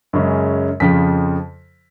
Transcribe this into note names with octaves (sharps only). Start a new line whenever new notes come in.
F#2 C#3 G#3 C#4
F2 C#3 F3 B6